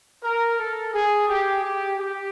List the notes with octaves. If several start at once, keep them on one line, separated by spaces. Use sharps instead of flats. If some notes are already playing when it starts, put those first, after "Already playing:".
A#4
A4
G#4
G4
G4
G4